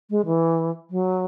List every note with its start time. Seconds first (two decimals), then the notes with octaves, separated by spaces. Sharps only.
0.10 G#3
0.26 E3
0.90 F#3